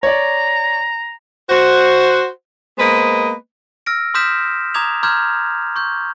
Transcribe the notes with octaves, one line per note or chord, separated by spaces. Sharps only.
C#5 D5 A#5
F#4 C5
G#3 A#3 B3 B4 C5 D#5
E6 F6 A#6 D7
C6 D#6 F6 G6 B6 E7
A#5 D6 D#6 G#6 F7
A#5 C6 D6 F6 G6 G#6
C#6 G6